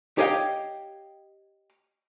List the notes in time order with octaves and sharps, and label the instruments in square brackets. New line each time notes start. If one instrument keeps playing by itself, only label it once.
[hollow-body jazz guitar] G4 C#5 D#5 F5 G5